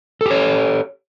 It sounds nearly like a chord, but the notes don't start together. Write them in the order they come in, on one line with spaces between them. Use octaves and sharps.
A4 G4 C#5